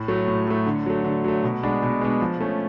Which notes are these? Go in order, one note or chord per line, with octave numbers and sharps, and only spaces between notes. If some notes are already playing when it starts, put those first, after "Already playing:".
Already playing: A2
F#3 A3
A2
F#3 A3
D3
F#3 A3
D3
F#3 A3
B2
G#3 B3 D4
B2
G#3 B3 D4
F3
A3 C#4